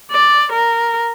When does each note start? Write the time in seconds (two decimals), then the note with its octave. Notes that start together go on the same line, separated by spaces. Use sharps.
0.11 D5
0.53 A#4